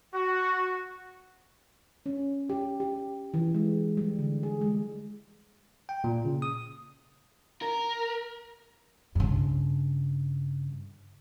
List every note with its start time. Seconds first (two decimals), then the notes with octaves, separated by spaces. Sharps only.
0.14 F#4
2.06 C#4
2.50 G4
2.80 G4
3.34 E3
3.54 G#3
3.97 G3
4.19 D3
4.43 G#4
4.61 G#3
5.89 G5
6.04 A#2
6.25 C#3
6.42 D#6
7.62 A#4
9.15 G2 C#3